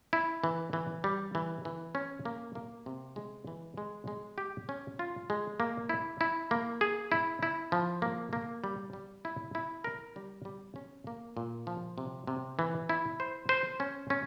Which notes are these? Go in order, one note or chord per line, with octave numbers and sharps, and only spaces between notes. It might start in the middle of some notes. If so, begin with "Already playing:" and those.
E4
E3
E3
G3
E3
E3
C#4
A#3
A#3
C3
G#3
E3
G#3
G#3
G4
C#4
F4
G#3
A#3
E4
E4
A#3
G#4
E4
E4
F3
A#3
A#3
G3
G3
E4
E4
A#4
G3
G3
C#4
A#3
A#2
F3
C3
C3
E3
E4
C5
C5
C#4
C#4